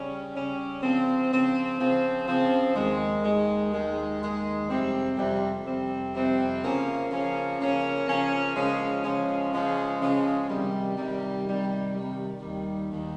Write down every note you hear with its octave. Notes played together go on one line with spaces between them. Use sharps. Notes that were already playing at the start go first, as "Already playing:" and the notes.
Already playing: C#3 G3 C#4
C#3 G3 C#4
C#3 F3 C4
C#3 F3 C4
C#3 F3 C4
C#3 F3 C4
D#2 D#3 G#3
D#2 D#3 G#3
D#2 D#3 G#3
D#2 D#3 G#3
F2 C3 G3 C4
F2 C3 G3 C4
F2 C3 G3 C4
F2 C3 G3 C4
C#3 F3 A#3 C#4
C#3 F3 A#3 C#4
C#3 F3 A#3 C#4
C#3 F3 A#3 C#4
C#3 F3 G#3 C#4
C#3 F3 G#3 C#4
C#3 F3 G#3 C#4
C#3 F3 G#3 C#4
C3 D#3 G3
C3 D#3 G3
C3 D#3 G3
C3 D#3 G3
D#2 D#3 G3
D#2 D#3 G3